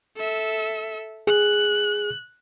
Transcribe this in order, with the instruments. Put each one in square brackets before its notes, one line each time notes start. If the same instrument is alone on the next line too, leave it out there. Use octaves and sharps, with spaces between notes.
[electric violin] A4 E5
[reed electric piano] G#4 [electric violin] F#6